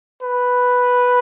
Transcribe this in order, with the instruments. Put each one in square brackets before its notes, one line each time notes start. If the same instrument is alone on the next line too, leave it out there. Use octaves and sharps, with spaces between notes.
[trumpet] B4